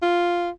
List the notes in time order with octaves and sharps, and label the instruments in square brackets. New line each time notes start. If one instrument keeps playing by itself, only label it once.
[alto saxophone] F4